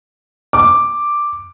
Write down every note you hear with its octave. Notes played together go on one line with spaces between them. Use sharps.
D6